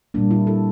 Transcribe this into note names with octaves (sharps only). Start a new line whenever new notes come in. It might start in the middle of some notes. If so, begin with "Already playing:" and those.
A#2 G3 A#3 D4
E4
A4